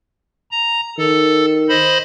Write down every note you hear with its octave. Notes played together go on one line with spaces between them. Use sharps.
A#5
D#3 A4
C5 D#5 B5